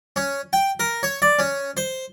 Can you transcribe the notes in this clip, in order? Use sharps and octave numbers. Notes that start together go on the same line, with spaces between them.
C#4
G5
A#4
C#5
D5
C#4
C5